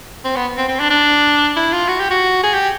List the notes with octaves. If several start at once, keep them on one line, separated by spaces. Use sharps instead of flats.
C4
B3
C4
C4
D4
D4
E4
F4
F#4
G4
F#4
G#4
G4